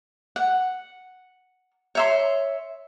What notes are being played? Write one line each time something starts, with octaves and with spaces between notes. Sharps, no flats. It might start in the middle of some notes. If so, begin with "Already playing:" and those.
F#5
C#5 E5 C6